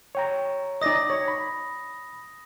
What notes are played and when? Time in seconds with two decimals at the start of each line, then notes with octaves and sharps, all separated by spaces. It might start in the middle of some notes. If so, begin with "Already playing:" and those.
0.15 C#5 G5 A#5
0.82 D#4 D5 D#5 D#6 A#6
1.10 C#5
1.28 B5